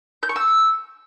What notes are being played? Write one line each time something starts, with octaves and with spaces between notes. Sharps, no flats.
G6
C#6
E6